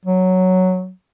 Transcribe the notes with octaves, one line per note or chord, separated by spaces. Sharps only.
F#3